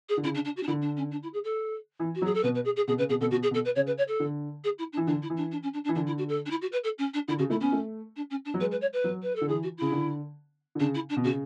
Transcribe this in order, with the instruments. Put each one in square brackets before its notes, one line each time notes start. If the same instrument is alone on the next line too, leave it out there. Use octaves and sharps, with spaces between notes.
[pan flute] G#4
[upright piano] D3
[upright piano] C#3 [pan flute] E4
[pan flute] D4
D4
F#4
D4
[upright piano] D3 [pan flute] E4
[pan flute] D4
C#4
D4
E4
G#4
A4
[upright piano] E3
[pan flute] F#4
[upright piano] F#3
[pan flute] G#4
A4
[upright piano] B2 [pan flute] B4
[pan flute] B4
G#4
G#4
[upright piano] B2 [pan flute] G#4
[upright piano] C#3 [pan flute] B4
[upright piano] B2 [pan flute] G#4
[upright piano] B2 [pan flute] A4
[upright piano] B2 [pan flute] F#4
[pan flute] G#4
[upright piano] B2
[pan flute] A4
B4
[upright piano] C#3 [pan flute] C#5
[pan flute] B4
C#5
A4
[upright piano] D3
[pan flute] G#4
E4
D4
[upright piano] E3
[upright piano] D3 [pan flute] D4
[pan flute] E4
[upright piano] E3
[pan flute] D4
D4
C#4
D4
D4
[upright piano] E3
[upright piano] D3 [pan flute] D4
[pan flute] E4
F#4
A4
D4
E4
F#4
B4
A4
C#4
D4
[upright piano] D3 [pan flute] E4
[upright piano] C#3 [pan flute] F#4
[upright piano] A3 [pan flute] E4
[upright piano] B3 [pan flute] C#4
[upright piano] A3
[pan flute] D4
C#4
D4
[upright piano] F#3
[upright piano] G#3 [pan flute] B4
[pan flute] B4
C#5
B4
[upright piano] F#3
[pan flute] B4
A4
[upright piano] D3
[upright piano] E3 [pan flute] G#4
[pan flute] F#4
[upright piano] C#3 [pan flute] E4
[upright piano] D3
D3
[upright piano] C#3 [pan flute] D4
[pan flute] E4
D4
[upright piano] B2
[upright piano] C#3 [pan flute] F#4